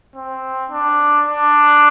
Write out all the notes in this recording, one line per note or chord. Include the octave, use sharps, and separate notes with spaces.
C4
D4
D4